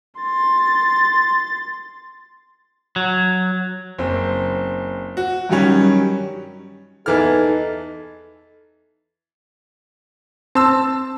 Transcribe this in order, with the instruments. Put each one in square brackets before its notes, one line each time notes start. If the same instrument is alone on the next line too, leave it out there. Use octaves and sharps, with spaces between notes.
[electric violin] C6 A6
[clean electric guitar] F#3
[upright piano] F#1 C4
F#4
G2 D#3 F#3 G3 C#4
[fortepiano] E2 E3 F6 [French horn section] D#4 A4
[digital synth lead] C4 [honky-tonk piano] A5 E6